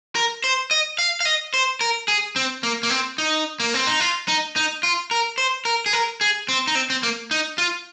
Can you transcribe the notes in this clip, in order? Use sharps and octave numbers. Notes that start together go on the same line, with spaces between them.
A#4
C5
D#5
F5
F5
D#5
C5
A#4
G#4
C4
A#3
A#3
C4
D#4
A#3
C4
D#4
F4
D#4
D#4
F4
A#4
C5
A#4
G#4
A#4
G#4
C4
D#4
C4
C4
A#3
D#4
F4